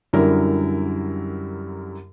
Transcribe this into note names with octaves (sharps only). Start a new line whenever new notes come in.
F#2 D3 G3 E4 A#4